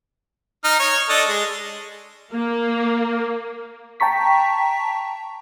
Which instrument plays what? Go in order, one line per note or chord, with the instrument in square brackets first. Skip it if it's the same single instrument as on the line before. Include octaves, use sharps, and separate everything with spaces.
[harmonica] D#4 F6
C#5
D4 A4 D#5
G#3
[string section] A#3
[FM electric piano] G5 A5 A#5 C#6 B6